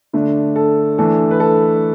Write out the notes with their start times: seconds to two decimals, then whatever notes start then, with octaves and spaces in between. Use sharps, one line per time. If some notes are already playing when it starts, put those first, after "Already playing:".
0.13 D3 A3 D4
0.56 A4
0.98 E3 A3 D4 A4
1.31 B4
1.40 A4